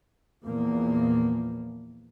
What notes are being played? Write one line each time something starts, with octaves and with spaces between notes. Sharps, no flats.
E2 A#2 F3 A#3